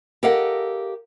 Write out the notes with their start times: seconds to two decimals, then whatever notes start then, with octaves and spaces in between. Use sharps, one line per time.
0.23 G4 A4 A#4 D#5 F5 F#5